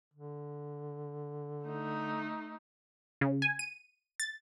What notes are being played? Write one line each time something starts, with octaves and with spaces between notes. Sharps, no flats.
D3
A3 D#4
C#3
G#5
D#7
A6